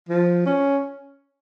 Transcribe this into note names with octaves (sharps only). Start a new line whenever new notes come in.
F3
C#4